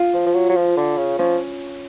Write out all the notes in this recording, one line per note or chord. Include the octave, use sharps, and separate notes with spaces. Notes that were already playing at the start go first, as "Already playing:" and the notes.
Already playing: F4
F3
F3
F#3
F#3
F3
D3
C#3
F3 C#4